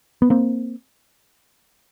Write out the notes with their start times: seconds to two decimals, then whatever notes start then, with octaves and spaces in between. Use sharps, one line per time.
0.22 B3
0.30 A#3 C4